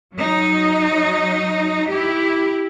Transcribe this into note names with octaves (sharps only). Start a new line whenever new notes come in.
F#3 D#4
E4 G4